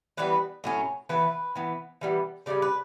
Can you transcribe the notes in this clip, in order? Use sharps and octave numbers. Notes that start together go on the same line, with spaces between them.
E3 G3 B3 B4
A2 F#3 C#4
E3 B3 B4
E3 B3
E3 G3 B3
C#3 G3 C#4 D5
B4